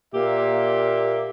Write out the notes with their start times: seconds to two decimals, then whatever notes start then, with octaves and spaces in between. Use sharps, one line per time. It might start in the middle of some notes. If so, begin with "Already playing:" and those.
0.14 A#2 A#3 G4 E5